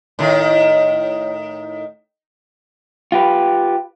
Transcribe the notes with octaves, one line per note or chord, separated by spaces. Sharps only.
A2 D#3
F4 G4 B4